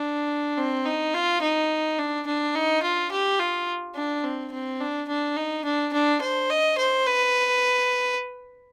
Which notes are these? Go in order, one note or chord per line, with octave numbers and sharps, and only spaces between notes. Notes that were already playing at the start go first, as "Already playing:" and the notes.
Already playing: D4
C4
D#4
F4
D#4
D4
D4
D#4
F4
G4
F4
D4
C4
C4
D4
D4
D#4
D4
D4
C5
D#5
C5
B4